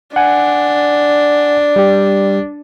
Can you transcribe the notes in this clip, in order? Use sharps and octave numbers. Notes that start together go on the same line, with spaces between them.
D4 F#5 G#5
G3 G4